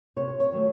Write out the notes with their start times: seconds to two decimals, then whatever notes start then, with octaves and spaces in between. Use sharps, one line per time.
0.16 C3 C#5
0.40 C#5
0.52 D#3 F#3 A3